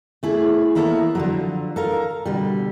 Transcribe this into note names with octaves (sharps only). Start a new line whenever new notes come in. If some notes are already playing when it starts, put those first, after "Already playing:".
A3 E4 G#4
A#3 B3 E4 A4 B4 C#5
D3 F3 F#3
A4 A#4 F5
B2 D3 G3